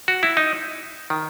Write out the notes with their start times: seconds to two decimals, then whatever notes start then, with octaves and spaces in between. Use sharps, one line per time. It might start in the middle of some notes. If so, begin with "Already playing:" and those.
0.08 F#4
0.23 E4
0.37 D#4
1.10 D#3